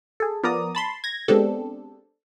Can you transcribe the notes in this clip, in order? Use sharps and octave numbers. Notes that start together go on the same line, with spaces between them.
G#4 A4
F3 B3 A#4 D5 A#5 D#6
A5 B5 C6
G#6 A#6
G#3 B3 C4 D4 G4 A4